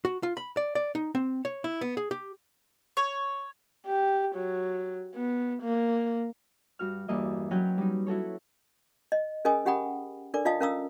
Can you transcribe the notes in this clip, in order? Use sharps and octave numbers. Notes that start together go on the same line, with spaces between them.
F#4
F4
B5
D5
D5
D#4
C4
C#5
E4
B3
G#4
G4
C#5
G4
F#3
B3
A#3
G2 F#4 F6
E2 G2 A#3 D#5 E5
F#3 C#4 B4 G5 F#6 G6
G3 D#4
E4 F#4 A4 C#5
D#5
C#4 G#4 A#4 D#5 G#5 D#6
C#4 G4 F#5 G5 B5 D#6
D4 A4 A#4 D5 D6
F4 D#5 F5 A5 D#6
C#4 A#4 F5 A#5 D#6 E6